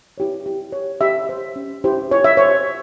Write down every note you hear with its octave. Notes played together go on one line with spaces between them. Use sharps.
E4 G4 C#5
G4
C#5
G4 E5
C5
C#4
E4 G4 C5
F4 C#5
E5
C5 C#5